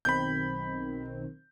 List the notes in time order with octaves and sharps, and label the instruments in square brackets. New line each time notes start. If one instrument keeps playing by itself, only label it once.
[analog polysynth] B1 D#3 C4 [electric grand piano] B5 G6